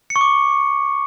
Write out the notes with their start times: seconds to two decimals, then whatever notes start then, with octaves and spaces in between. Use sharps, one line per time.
0.10 C#7
0.16 C#6
0.21 D6